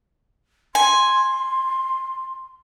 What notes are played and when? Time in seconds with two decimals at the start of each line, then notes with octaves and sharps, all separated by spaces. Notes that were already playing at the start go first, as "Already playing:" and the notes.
0.75 G#5 C6